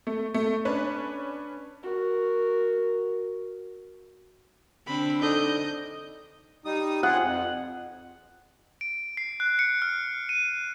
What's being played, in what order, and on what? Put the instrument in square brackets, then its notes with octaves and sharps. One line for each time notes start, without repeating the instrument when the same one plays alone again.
[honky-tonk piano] A3
A3
C#4 D4 B4
[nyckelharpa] F#4 A#4
[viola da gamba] D3 C4 D4 [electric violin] B5
[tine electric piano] D#4 A4 D5 [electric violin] D#5 G6
[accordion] G3 D#4 D#6
[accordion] C4 F4 G#4 [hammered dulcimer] F#5
[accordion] F2
[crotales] D7
C7
F#6
C#7
F6
D#7